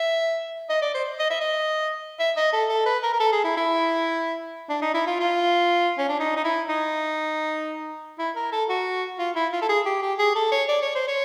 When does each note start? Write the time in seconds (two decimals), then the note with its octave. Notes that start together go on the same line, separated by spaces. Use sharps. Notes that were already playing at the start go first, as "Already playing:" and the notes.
Already playing: E5
0.70 D#5
0.82 D5
0.94 C5
1.19 D#5
1.30 E5
1.41 D#5
2.19 E5
2.37 D#5
2.53 A4
2.69 A4
2.86 B4
3.03 A#4
3.13 A#4
3.20 A4
3.32 G#4
3.44 E4
3.57 E4
4.69 D4
4.82 D#4
4.94 E4
5.07 F4
5.19 F4
5.98 C#4
6.09 D4
6.19 D#4
6.36 D#4
6.44 E4
6.69 D#4
8.19 E4
8.36 A#4
8.52 A4
8.69 F#4
9.19 F4
9.35 E4
9.53 F4
9.62 A4
9.69 G#4
9.86 G4
10.02 G4
10.19 G#4
10.36 A4
10.52 C#5
10.68 D5
10.82 C#5
10.95 C5
11.08 C#5